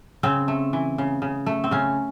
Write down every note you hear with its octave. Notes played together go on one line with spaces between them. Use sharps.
C#3 C4
A3
E3
C#3
C#3
A3
C4
C#3 C#4